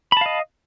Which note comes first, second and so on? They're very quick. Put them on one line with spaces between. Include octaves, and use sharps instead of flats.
B5 A5 F5 D#5